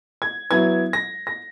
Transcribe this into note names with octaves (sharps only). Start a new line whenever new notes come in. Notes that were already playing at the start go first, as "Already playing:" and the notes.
G#6
F#3 B3 E4 G#6
A#6
A#6